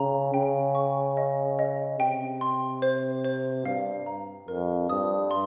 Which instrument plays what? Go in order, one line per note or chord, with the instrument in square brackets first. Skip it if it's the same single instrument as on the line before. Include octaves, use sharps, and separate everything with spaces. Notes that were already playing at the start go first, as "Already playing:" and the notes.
Already playing: [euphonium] C#3 [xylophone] A#5
[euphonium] C#3 [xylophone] G5
[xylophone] C#6
D#5
D#5
[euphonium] C3 [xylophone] G5
[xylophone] C6
C5
C5
[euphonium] G2 [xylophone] F5
[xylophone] A#5
[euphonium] F2 [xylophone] A#4
[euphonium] G2 [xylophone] D#6
[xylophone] C6